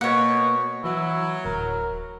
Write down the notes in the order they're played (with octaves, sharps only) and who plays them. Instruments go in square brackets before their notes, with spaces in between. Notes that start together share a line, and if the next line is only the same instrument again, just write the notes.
[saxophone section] B2 [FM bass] A#3 [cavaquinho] C#5 F#5
[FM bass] E3 [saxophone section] F#3 [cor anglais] E4
[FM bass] D1 [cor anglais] A#4